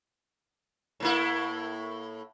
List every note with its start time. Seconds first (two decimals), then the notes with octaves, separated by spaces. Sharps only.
1.00 A2 A#3 E4